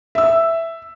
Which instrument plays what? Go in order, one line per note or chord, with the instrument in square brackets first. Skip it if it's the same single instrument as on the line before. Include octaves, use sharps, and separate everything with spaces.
[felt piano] E5 E6